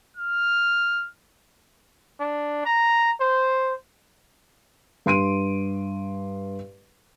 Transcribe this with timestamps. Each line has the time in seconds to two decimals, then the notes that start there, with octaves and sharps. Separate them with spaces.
0.17 F6
2.20 D4
2.65 A#5
3.21 C5
5.06 G2 C6 D7 D#7